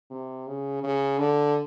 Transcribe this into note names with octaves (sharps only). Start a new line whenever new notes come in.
C3
C#3
C#3
D3